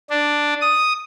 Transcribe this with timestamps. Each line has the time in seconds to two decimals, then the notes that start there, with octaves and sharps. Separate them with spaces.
0.10 D4
0.61 D#6